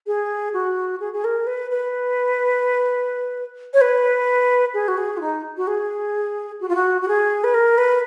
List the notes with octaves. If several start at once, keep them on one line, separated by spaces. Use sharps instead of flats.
G#4
F#4
G#4
G#4
A#4
B4
B4
C#5
B4
G#4
F#4
G#4
F4
D#4
F#4
G#4
F#4
F4
F#4
F#4
G#4
B4
A#4
B4